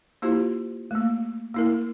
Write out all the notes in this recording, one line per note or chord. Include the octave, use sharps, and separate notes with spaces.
A#3 E4 F4 G4 C5
A3 A#3
A#3 E4 A#4